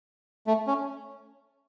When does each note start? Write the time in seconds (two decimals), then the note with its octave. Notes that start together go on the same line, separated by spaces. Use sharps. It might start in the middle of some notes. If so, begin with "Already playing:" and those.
0.47 A3
0.67 C#4